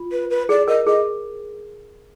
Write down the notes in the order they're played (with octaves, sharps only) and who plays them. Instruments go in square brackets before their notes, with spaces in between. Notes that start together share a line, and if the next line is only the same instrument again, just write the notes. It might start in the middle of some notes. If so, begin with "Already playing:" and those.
Already playing: [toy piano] F4
[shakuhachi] B4
B4
[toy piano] G#4 [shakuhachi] D5
[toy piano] A#4 [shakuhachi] D#5
[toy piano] G#4 [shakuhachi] D#5